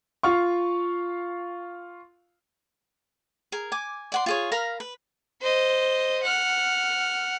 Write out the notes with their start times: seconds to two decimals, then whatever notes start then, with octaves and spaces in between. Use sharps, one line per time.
0.23 F4 F5 C#6
3.52 G#4 A#4
3.72 G#5 D6
4.12 D5 F#5 C6
4.26 F4 G#4 C#5
4.52 A#4 F5 A#5 B5
4.80 B4
5.41 C5 D#5
6.23 F#5 F6